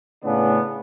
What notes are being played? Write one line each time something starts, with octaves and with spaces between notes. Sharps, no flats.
A2 C#3 B3 D4